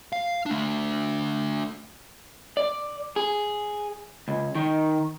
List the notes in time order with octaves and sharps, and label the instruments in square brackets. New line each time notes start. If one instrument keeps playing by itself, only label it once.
[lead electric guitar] F5
A3 D4
[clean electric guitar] D5
G#4
C#2
D#3